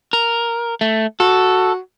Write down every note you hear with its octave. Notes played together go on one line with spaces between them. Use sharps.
A#4
A3
F#4 A4